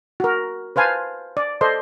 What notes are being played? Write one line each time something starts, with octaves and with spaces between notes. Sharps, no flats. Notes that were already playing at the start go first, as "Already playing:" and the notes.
F#4 A#4
B4 C5 F5 G#5 A5
D5
A4 C5 D5 D#5 C6